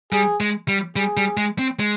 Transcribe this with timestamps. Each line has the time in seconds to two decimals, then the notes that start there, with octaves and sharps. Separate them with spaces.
0.12 G3 G#4
0.41 G#3
0.68 G3
0.96 G3 G#4
1.17 G3
1.37 G#3
1.59 C4
1.79 G#3